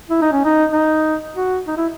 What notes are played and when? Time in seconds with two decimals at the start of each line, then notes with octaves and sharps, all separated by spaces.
0.09 E4
0.22 D#4
0.32 C#4
0.45 D#4
0.72 D#4
1.35 F#4
1.67 D#4
1.77 E4